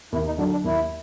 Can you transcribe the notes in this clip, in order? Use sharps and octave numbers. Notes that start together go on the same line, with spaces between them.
D#2 E4
D#4
D3 F#3 D4
D4
D#2 E4